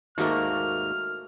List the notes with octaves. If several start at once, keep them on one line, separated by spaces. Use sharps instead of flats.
D#2 G#2 A3 A#3 F#4 A#4 F6